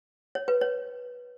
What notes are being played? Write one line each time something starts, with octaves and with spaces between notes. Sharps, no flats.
C#5
B4
C#5